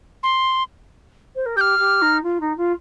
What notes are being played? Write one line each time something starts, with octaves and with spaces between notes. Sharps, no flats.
C6
C5
A#4
G4 F6 G6
G4
D#4
F4
D#4
F4